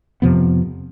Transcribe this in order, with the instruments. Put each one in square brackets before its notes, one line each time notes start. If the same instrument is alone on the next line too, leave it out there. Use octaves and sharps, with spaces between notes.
[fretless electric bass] F2 C3 F3 B3